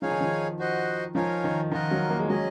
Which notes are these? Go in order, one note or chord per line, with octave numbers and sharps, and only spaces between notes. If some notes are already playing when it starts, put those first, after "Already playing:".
F3 D#4 G#4 C#5 F5 G#5
D#3
F3
F#4 C5 D#5 F#5
F3 D#4 A#4 C#5 F5 G#5
D#3
D#3 F4 A#4 D#5 F#5
F#3
A#3
G#3
F#3 C#4 G#4 D#5